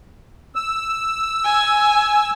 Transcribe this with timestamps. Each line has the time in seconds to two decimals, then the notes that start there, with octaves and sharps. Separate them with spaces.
0.55 E6
1.45 G#5